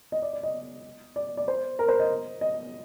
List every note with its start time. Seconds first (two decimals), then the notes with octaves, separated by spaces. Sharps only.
0.12 D#5
0.22 D5
0.33 D5
0.43 D#5
1.16 D5
1.37 D5
1.48 C5
1.79 A#4
1.89 C5
1.99 D#5
2.41 D#5